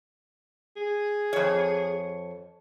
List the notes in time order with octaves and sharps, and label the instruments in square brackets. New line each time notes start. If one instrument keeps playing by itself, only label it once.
[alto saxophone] G#4
[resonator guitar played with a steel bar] F2 C#5